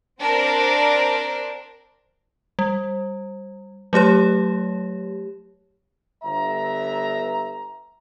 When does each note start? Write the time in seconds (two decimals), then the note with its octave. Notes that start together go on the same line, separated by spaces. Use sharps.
0.20 C4 D4 A#4 C5
2.59 G3
3.93 F#3 A3 G4 C#5
6.23 G1 E5 A#5